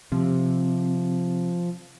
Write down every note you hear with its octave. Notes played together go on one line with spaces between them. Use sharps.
C3 F3